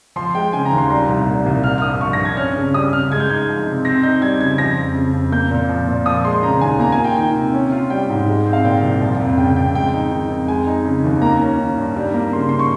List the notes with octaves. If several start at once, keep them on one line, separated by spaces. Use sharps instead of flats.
F3 C6
G#3 G5
C#3 G#5
A#5
D#2
C6
G3 A#5
C2
A#2
C2
C4 F6
F6
G2 D#6
F3 C#6
A#6
G2
G#6
C#4 F6
C#3
G3 D#6
C#3 F6
G#3 G#6
G6
D#4 G#6
F3
C3
C4 A#6
D#4 G6
G3 G#6
C#3 G#6
F3 A#6
F2
C#3
F2
A#3 G6
A#2
F3
A#2
F3 D#6
G#3 C6
C#3 A#5
D#2 G#5
A#3 A#5
G#5
F4
G5
D#3 G5
C3
C#4
F4
G3 G5
G#2
G#3
C4
F5
A#2 G5
C2
F3
F2
C#3 G5
F2 G5
G#3 G5
D#4
D#3
F2
G#3 G#5
D#4
C#3
D#2
A#3 A#5
C#4
D#3
G2
G3
A#3
C#3 C6
C6
C#6